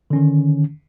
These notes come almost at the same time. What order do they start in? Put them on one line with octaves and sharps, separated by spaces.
D3 C#4 D#3